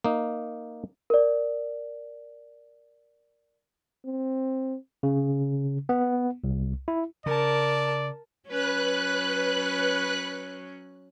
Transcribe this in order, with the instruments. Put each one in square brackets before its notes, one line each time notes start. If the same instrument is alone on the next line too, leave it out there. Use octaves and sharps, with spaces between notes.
[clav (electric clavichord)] A#3 D#4
[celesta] A#4 D5
[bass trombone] C4
[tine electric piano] C#3
B3
C2
E4
[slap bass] C#3 [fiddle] A#4 A5 [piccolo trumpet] D5
[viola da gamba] F#3 C#4 [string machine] B4 F#6